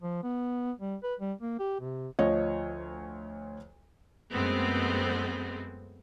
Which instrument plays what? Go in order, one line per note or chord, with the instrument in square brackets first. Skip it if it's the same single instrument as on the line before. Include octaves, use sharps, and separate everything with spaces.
[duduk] F3
B3
G3
B4
G3
A#3
G4
C3
[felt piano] D2 F3 C#5 D#5
[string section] F#2 G#3 A3 B3 C4